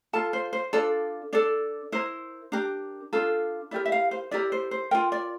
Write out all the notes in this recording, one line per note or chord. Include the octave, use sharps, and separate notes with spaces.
F4 A4 A5
C5
C5
D4 F4 A4 D5
D4 A4 D5
E4 A#4 C5
D4 G4 A#4
D4 F4 A4
E4 G4 A#4 D5
E5
F5
C5
E4 G4 A#4 D5
C5
C5
F4 A#4 G5
D5